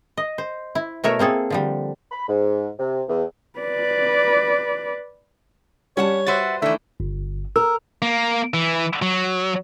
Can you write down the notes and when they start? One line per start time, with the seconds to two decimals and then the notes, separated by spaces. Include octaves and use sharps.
0.17 D#5
0.38 C5
0.75 E4
1.04 B2 A3 A#4 C#5 E5
1.19 A#3 C4 G#4 A4
1.50 D3 F3 G3
2.11 B5
2.28 G#2
2.79 C3
3.08 E2
3.59 B4 D5
5.97 G3 C#4 C#5 F#5 A5
6.27 F#4 B4 C5 E5 F#5 A6
6.62 D#3 E3 A3 D4 E5
7.00 G1
7.56 A#4 E6
8.02 A#3
8.54 E3
9.02 F#3